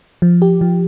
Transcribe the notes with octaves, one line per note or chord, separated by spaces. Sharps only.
F3
G4
F3